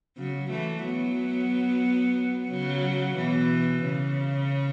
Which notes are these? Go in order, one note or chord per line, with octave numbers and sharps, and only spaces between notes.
C#3 F#3
E3 A3
F#3 B3
C#3 F#3
B2 E3
C#3